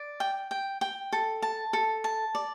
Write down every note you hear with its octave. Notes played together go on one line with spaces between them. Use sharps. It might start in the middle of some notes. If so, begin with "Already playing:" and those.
Already playing: D5
G5
G5
G5
A4
A5
A4
A5
D5